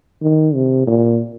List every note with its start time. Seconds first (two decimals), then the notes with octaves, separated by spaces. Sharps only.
0.22 D#3
0.54 C3
0.87 A#2